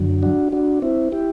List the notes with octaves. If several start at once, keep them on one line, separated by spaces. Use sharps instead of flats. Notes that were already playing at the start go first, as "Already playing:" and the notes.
Already playing: F#2 D3 F#3
D4 F#4
D4 F#4
C4 E4
E4 G4